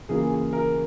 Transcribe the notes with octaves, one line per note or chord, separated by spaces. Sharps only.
C#3 E3 A#3 F4 G#4
G#4
A#4